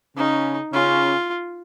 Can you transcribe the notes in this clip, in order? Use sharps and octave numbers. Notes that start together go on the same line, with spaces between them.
C#3 C#4 D#4
C#3 C#4 F4